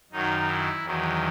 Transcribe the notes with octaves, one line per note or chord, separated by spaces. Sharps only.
F#2 D#3 F#3 D#4
E4
E2 D#3 F#3